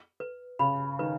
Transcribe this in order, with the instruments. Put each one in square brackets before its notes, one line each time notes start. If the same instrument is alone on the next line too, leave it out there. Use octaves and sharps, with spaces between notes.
[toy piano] B4
[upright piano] C#3 [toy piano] B5
[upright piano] D#3 [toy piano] B4